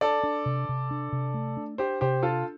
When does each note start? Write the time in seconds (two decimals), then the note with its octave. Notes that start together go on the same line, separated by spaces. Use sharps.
0.01 D4 A4 D5
0.23 D4
0.46 C3
0.69 C3
0.91 D4
1.12 C3
1.34 A3
1.57 D4
1.78 D4 G4 C5
2.01 C3 G4 C5
2.23 D4 F4 A4